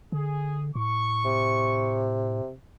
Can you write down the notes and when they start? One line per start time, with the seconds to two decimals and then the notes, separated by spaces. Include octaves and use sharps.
0.12 D3 G#4
0.76 A2 C#6
1.25 C3